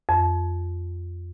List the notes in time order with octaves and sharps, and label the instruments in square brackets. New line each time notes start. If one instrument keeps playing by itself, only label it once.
[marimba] F2